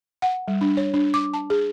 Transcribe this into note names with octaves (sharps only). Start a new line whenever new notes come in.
F#5
G3
D4
C#5
D4
D6
A5
G#4